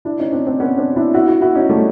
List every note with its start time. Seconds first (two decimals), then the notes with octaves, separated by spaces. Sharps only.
0.05 D4 E4
0.19 C#4 D#4
0.33 C4 D4
0.47 C4 D4
0.60 B3 C#4
0.78 C4 D4
0.96 D4 E4
1.14 E4 F#4
1.28 E4 F#4
1.42 E4 F#4
1.55 C#4 D#4
1.69 G3 A3